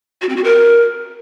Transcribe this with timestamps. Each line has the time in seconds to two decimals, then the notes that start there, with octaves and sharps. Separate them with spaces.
0.22 F#4
0.29 C4
0.37 F#4
0.44 A#4